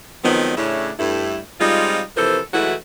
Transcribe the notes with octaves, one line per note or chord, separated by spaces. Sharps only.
D#3 F3 F#3 G#3 B3 C4
A2 C#3 C#4 D4 E4
G2 A3 E4
G3 G#3 C4 D#4 F4
C3 E3 F3 A4 A#4 C5
E3 F#3 G#3 A3 E4 F#4